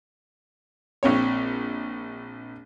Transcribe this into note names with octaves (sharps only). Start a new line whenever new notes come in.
A#1 C4 C#5